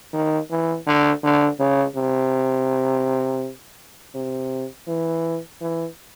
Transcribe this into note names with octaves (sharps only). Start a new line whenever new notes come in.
D#3
E3
D3
D3
C#3
C3
C3
E3
E3